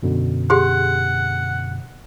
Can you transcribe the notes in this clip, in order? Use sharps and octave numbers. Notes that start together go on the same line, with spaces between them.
F#2 B2 D3
G4 G#4 F#5 C6